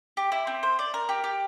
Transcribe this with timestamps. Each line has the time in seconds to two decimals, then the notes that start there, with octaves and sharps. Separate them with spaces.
0.17 G4
0.32 E4
0.47 C4
0.63 C5
0.79 D5
0.94 A#4
1.09 G4
1.24 G4